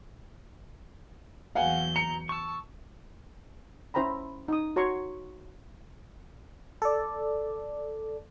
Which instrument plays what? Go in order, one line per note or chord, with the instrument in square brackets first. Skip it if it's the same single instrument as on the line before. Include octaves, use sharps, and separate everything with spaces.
[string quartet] E2 F#3 G6 [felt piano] F5 F#5 G#5
[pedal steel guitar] A#5 [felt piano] C#7
[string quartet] A5 [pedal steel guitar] C#6 E6
[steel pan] C#4 E4 C5 G5 A#5 B5
D#4 D#6
F#4 C#5 A#5 C6 C#6
[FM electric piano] A4 D5